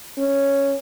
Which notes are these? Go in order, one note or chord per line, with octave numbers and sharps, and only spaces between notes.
C#4